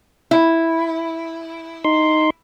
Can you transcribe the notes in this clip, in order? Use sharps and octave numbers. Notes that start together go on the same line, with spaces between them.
E4
D#4 C6